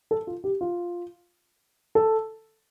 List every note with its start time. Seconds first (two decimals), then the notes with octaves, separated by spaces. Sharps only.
0.11 A4
0.27 F4
0.44 G4
0.61 F4
1.95 A4